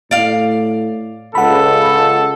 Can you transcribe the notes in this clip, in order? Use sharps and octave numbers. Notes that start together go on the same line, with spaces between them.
A2 D5 F5
C#2 A4 F#5 B5